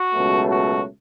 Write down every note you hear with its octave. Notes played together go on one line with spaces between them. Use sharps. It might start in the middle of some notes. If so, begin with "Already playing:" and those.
Already playing: F#4
C#2 B2 F#3 A3
F#4